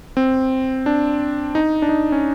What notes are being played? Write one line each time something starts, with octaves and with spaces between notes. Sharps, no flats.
C4
D4
D#4
D4
D#4
C#4